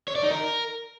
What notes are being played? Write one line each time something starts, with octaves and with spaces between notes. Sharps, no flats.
C#5
D5
D#4
A#4